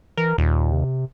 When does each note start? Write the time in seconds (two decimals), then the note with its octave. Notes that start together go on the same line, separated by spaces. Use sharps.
0.17 E3 A#4
0.38 D#2 A#2
0.72 C3